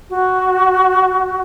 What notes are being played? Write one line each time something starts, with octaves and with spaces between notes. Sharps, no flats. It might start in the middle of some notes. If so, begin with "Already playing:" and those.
F#4